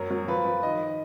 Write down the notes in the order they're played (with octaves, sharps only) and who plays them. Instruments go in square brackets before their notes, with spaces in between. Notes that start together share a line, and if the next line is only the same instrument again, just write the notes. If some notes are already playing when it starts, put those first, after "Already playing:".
Already playing: [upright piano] F#2 F#3 A#4
F#3
F3 B4
F3
D#3 D#5